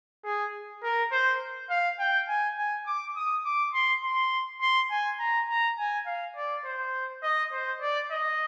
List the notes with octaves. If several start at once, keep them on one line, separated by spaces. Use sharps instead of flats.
G#4
A#4
C5
F5
G5
G#5
G#5
D6
D#6
D6
C6
C6
C6
G#5
A#5
A#5
G#5
F5
D5
C5
D#5
C5
D5
D#5